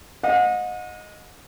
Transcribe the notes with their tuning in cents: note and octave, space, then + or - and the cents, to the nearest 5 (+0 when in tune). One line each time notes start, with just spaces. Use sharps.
D#5 +0 F#5 -40